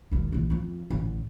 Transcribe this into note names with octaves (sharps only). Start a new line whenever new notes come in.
E1 D#3
A#1 E3
F2 F3
A1 D3